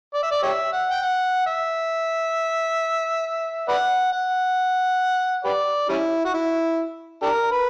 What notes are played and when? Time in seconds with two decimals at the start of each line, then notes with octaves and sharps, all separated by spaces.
0.14 D5
0.23 E5
0.31 D5
0.43 G4 C#5 E5
0.73 F#5
0.91 G5
1.02 F#5
1.46 E5
3.68 B4 D5 F#5
4.13 F#5
5.45 G4 B4 D5
5.89 G3 C#4 E4
6.25 F#4
6.34 E4
7.22 D4 G4 A#4
7.52 B4